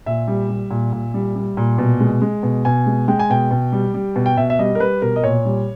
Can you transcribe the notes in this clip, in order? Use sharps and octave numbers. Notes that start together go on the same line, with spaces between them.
A#2 E5
G3
G3
A#2
A#2
G3
G3
A#2
B2
G#3
G#3
B2
B2 G#5
G#3
G#3 G5
G#5
B2 G5
B2
G3
G3
B2
G5
B2 E5
E5
G3 D#5
A#4
G3 B4
B2 A#4
D#5
A#2 C#5
G3